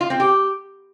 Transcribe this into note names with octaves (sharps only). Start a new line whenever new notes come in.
F4
C4
G4